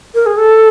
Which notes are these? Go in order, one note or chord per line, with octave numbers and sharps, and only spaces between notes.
A#4
G#4
A4